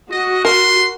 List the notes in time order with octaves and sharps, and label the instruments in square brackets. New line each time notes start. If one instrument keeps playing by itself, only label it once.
[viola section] F#4 [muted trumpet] D#5
[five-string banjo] A#4 [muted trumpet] C6